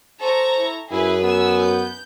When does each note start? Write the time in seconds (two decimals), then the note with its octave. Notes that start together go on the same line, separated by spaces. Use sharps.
0.22 A4 C5 A#5 C#6
0.58 E4
0.91 F#2 E4 G#4 B4 G#5
1.23 B3 G#5 E6
1.62 G6